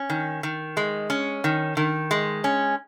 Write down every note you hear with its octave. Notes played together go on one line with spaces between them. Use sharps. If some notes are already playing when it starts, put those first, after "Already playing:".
Already playing: C#4
D#3
D#3
G#3
C#4
D#3
D#3
G#3
C#4